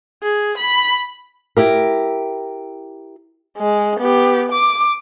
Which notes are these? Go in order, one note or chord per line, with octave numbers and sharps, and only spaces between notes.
G#4
B5
E4 G4 A#4
G#3
B3 G4
D6